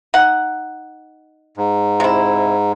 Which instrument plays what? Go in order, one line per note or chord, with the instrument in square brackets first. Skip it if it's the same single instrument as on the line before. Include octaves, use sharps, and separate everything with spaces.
[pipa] D#4 F#5
[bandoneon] G#2
[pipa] C3 E4